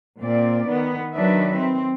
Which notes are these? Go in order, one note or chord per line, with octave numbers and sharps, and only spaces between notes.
A#2 C4 D5
D#3 B3
D#3 F#3 D4 B4 E5
C4